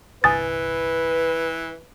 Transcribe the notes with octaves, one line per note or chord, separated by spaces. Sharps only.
G1 C2 E3 B4 G#5 D#6 A6